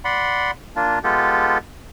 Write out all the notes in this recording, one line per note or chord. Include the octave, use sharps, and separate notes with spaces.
D5 F#5 B5 C6
A#3 D4 F4
G#3 B3 F4 G4 A4